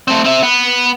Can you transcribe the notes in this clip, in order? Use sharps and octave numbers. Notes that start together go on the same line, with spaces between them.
A3 C4
C4 E5
B3